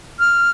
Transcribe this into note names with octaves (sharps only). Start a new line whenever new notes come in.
F6